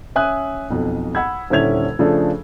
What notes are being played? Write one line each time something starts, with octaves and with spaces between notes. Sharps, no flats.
C#4 E5 G#5 D#6 F#6
B1 F2
F#5 B5 E6 G#6
D#1 D3 C#4 E4 G#6 F7
C#3 F3 A3 D4 G#4 A4